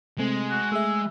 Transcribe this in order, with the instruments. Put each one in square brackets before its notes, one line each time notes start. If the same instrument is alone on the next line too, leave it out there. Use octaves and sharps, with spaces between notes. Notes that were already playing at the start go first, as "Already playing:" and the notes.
[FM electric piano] C3 A3 C4 [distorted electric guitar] G#3
[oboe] F#4
[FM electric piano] A3 G#4 E5 [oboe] E6